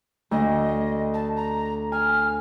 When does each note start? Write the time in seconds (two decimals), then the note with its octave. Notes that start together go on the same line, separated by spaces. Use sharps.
0.31 D2 D#5
1.13 A5
1.36 A#5
1.92 G#5 F6